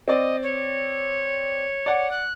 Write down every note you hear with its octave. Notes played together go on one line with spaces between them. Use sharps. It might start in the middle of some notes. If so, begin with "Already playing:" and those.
C4 D5 D#5
C#5
D5 F#5
F#6